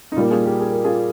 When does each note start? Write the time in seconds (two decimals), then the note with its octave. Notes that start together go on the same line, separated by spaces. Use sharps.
0.12 D#4
0.16 A#2 G3 A#3 F4
0.31 F4 G#4
0.45 G4 A#4
0.61 G#4
0.72 A#4
0.84 F4 G#4